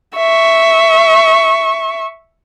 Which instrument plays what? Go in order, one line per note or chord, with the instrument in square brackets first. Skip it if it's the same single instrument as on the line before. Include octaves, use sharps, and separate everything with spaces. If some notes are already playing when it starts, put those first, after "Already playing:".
[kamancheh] E5 C#6